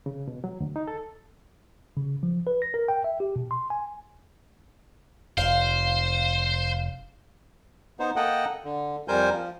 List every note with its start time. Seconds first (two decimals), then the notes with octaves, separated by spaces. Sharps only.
0.06 C#3
0.28 B2
0.44 F#3
0.60 D2
0.76 D#4
0.88 A4
1.97 C#3
2.23 F3
2.47 B4
2.62 A#6
2.74 A#4
2.88 G5
3.04 E5
3.20 G4
3.36 B2
3.51 C6
3.70 G#5
5.37 F1 C5 F5
8.00 B3 D#4 C5
8.16 A#3 A4 D#5 F#5 G5
8.64 D3
9.08 F2 G3 A#4 C5 G#5 G6
9.32 F3